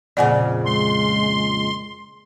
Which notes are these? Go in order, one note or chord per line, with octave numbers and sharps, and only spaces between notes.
F2 A#2 C#3 D5 F#5 G#5
G#3 C6